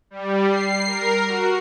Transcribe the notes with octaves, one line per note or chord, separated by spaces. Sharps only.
G3
C7
A#4
F#4